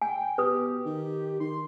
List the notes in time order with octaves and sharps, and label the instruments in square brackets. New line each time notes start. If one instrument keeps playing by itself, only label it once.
[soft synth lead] G5 [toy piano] G#5
[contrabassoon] B2 [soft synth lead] G4 [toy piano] B4 D#6
[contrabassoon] D#3
[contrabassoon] D#3 [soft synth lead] C6